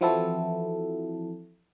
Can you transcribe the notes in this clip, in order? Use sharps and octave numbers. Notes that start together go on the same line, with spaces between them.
E3 F3 C4 E4 F#4 A4